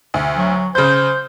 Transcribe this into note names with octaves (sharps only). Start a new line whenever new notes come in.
D2
F#3
C#3 C5 G6